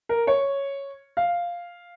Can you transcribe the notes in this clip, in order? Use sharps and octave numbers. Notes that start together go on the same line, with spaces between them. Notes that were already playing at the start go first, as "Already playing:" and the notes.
A#4
C#5
F5